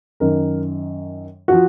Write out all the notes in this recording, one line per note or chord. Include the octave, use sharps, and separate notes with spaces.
F#2 D#3 A#4
F3 F#4